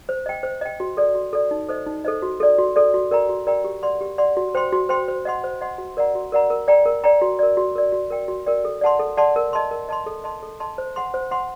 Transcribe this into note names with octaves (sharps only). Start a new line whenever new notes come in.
C5
D#5 G5
C5
D#5 G5
F#4
A4 D5
F#4
A4 D5
D#4
A4 C5 D#5
D#4
A4 C5 D#5
F#4
A4 D5
F#4
A4 D5
F#4
A#4 D5 G5 A#5
F#4
A#4 D5 G5 A#5
G4
D5 F#5 C6
G4
D5 F#5 C6
F#4
C5 G5 C6
F#4
C5 G5 C6
C5
D#5 F#5 C6
C5
D#5 F#5 C6
F#4
A#4 D5 F#5 A#5
F#4
A#4 D5 F#5 A#5
A#4
D5 G5 A#5
A#4
D5 G5 A#5
F#4
A#4 D5
F#4
A#4 D5
F#4
A#4 D5 G5
F#4
A#4 D5 G5
A4
D5 F#5 A5 C6
A4
D5 F#5 A5 C6
A#4
D#5 A5 C6
A#4
D#5 A5 C6
A4
D#5 A5 C6
A4
D#5 A5 C6
C5
F#5 C6
C5
F#5 C6